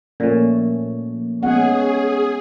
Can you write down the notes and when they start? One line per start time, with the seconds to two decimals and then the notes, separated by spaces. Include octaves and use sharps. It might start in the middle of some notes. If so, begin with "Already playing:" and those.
0.20 A#2 F3 A3 C#4
1.43 G#3 B3 C#4 G#4 F#5